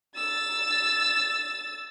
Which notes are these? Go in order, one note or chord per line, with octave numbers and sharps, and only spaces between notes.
E6 A6